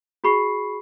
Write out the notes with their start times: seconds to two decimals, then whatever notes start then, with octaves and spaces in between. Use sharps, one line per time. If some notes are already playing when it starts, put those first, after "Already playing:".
0.24 F#4 G#4 B5 C#6 C7